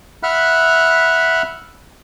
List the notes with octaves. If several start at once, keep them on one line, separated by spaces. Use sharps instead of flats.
E5 F#5 B5 F6 F#6